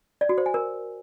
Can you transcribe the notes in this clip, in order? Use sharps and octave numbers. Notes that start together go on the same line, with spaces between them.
D5
F#4
C5
G#5
A#4